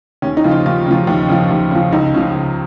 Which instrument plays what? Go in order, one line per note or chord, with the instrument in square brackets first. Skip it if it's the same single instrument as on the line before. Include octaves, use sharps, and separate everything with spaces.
[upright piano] D#2 C#4
D#4
C#3 F3
F4
D#2 F4
C#3 F3
D#2
C#3 F3
D#2
C#3 F3
C#2 D#4
C#3 F3
C#2